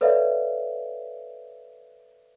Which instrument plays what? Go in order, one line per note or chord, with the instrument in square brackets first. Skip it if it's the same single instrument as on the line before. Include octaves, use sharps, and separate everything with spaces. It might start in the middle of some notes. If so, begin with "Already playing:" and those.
[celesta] A4 B4 C#5 D5 E5 F5